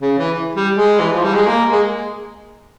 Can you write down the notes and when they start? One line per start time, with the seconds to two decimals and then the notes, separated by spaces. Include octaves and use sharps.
0.01 C#3
0.18 E3
0.55 G3
0.74 G#3
1.00 E3
1.12 F3
1.24 G3
1.35 G#3
1.47 A#3
1.72 G#3